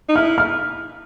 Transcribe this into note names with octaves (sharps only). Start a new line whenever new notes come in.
D#4
E4 F6
F6